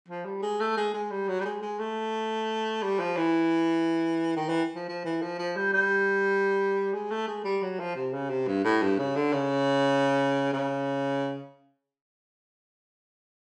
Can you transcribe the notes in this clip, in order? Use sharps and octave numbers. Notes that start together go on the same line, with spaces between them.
F3
G3
G#3
A3
G#3
G#3
G3
F#3
G3
G#3
G#3
A3
G3
F3
E3
D#3
E3
F3
F3
E3
F3
F3
G3
G3
G#3
A3
G#3
G3
F#3
F3
C3
C#3
C3
G2
A2
G2
C#3
D3
C#3
C#3